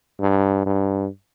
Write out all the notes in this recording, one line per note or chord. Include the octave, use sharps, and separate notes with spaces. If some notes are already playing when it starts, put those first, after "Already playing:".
G2
G2